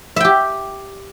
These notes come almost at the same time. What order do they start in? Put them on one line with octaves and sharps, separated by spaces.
E5 G5 G4